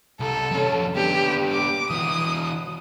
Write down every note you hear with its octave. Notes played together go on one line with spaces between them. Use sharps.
C2 A4
F2 C#4
B3 D4 G4
D6
E3 F#4 D#6